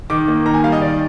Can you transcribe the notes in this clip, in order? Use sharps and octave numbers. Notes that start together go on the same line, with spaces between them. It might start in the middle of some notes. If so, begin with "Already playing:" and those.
D#3 D6
A#3
D#3 A#5
G#5
G3 F5
D#5
D#3 D5